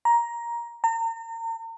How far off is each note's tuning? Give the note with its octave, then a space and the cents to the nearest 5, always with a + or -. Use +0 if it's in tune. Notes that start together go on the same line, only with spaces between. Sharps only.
A#5 +15
A#5 -40